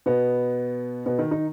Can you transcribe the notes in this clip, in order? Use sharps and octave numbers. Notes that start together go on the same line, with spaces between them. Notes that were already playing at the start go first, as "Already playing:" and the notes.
B2 B3
B2 B3
D#3 D#4
D#3 D#4